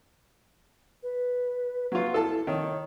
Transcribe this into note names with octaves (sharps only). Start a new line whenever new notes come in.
B4
F#3 F4 B4
E4 A4 A5
D#3 C#5